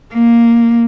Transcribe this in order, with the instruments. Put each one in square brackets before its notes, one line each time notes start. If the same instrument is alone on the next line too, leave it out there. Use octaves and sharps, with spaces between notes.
[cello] A#3